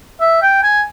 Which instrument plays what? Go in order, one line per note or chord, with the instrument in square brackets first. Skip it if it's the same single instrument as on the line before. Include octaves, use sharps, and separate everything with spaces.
[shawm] E5
G5
G#5